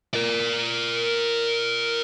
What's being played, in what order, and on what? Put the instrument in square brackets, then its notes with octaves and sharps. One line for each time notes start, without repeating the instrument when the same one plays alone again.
[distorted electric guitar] A#4 D5